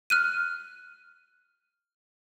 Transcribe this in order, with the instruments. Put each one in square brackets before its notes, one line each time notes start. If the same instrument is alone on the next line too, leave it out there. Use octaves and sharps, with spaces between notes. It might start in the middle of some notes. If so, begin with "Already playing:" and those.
[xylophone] F6 F#6 D#7